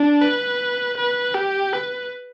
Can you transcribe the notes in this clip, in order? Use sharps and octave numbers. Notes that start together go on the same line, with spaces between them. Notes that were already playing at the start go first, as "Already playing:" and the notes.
Already playing: D4
B4
B4
G4
B4